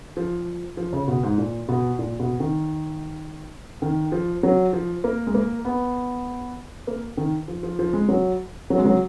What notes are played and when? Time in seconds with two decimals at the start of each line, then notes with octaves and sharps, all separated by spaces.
0.17 F3
0.77 F3
0.93 C#3
1.08 B2
1.23 G#2
1.38 A#2
1.69 B2
1.99 A#2
2.20 B2
2.40 D#3
3.82 D#3
4.12 F3
4.43 F#3
4.73 F3
5.04 A#3
5.27 G#3
5.34 A#3
5.65 B3
6.87 A#3
7.17 D#3
7.48 F3
7.63 F3
7.79 F3
7.93 G#3
8.09 F#3
8.70 F#3
8.78 G#3
8.85 F#3